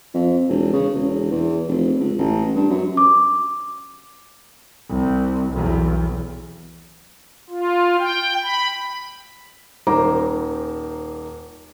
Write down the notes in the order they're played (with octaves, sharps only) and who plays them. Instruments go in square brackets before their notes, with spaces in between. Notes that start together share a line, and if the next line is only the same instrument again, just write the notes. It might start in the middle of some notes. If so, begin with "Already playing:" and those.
[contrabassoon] F2
E1
C#3
E1
E2
F1
C#2
A1
G2
F#2
[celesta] D6
[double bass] C2
B1 E2
[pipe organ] F4
G5
B5
[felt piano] D#1 D#3 C5 A#5 D6